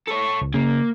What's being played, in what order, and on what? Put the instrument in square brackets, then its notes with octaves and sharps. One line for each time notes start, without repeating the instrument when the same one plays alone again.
[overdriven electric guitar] A4 C#5
[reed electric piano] C#2
[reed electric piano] C#3 [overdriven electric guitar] A#3